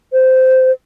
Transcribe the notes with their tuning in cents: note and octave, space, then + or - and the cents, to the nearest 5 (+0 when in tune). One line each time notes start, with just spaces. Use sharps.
C5 -15